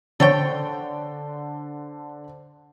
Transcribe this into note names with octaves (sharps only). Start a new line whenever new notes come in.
D3 A4 C5 C#5 G5